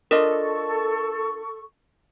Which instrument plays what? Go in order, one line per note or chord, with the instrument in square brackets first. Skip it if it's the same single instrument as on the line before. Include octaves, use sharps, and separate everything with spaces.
[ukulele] D4 F4 D#5 [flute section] A4 C#6 [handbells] A#4